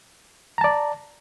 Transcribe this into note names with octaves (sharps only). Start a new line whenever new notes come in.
D5 A5 A#5